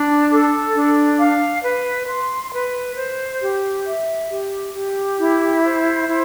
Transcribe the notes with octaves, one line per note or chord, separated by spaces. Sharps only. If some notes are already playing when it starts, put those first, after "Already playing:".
Already playing: D4
A4
D4
F5
B4
C6
B4
C5
G4
E5
G4
G4
E4
C5
E4